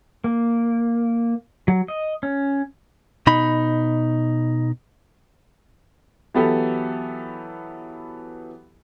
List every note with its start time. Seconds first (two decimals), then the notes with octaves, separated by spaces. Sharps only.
0.24 A#3
1.68 F#3
1.88 D#5
2.23 C#4
3.27 B2 D#4 B5
6.34 E3 F#3 B3 E4 G4 A4